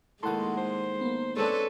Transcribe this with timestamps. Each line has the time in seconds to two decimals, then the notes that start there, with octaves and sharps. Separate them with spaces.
0.23 A2 D#3 G#3 A#3 A4 F#5 C6
0.57 C5
1.01 A#3 B3
1.36 G#3 C4 D4 A4 B4 C#5